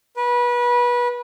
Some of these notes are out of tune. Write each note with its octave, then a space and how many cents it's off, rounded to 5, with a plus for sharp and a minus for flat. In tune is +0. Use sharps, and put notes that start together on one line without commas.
B4 -25